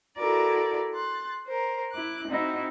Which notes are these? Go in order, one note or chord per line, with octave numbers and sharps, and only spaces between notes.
E4 F#4 A4 A#4 D5
C6 F#6 A6
A#4 C5
E4 D6 F#6
C4 D#4 E4 F#4